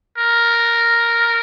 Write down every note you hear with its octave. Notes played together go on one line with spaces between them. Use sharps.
A#4